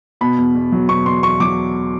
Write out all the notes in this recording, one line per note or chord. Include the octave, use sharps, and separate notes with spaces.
B2 B5
E2
E2
F#3
B2 C#6
E2 C6
E2 C#6
F#3 D6